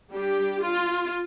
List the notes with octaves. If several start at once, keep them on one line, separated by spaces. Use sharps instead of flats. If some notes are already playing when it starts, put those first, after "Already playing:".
G3 D4 G4
F4